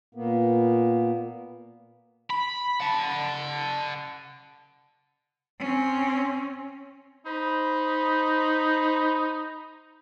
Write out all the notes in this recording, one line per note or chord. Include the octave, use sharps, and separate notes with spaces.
A#2 A#3 B3
B5
F#5 A5
C4 C#4
D#4 C5 B5